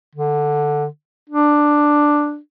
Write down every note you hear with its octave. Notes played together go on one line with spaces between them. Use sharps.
D3
D4